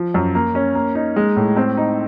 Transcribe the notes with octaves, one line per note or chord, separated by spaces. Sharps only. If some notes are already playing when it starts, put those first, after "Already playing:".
Already playing: F3
F#2
A#3
C#4
A#3
D#4
G#3
A2
C4
D#4